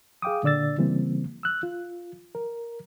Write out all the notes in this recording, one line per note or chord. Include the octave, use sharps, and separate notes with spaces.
G#4 F5 G5 D6 D#6
A#2 D3 D5 E6 A6
C#3 E3 G3 A#3 C4
E6 F#6
F4
A#4